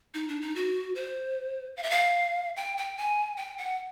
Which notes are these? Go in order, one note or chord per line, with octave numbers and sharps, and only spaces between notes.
D#4
D4
D#4
F#4
C5
F5
E5
F5
G5
G5
G#5
G5
F#5